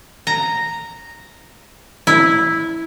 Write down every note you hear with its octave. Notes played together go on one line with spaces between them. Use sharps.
A#5
E4